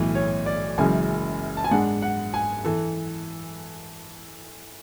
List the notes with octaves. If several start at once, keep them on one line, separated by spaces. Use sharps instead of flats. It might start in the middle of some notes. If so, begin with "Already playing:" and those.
Already playing: B1 A2 E3
C#5
D5
F#1 F#2 C#3 E3 G#3 G#5
A5
G#5
G#2 G#3 D4 F#5
F#5
G#5
E3 A4